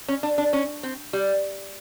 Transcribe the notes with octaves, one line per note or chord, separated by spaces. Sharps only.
C#4
D4
D4
C#4
C4
G3